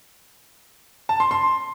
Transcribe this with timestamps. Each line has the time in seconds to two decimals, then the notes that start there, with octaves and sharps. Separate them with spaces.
1.09 A5
1.20 C6
1.31 C6